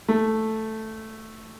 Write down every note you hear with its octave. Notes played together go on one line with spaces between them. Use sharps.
A3